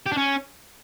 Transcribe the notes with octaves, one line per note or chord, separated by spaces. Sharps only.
G4
D4
C#4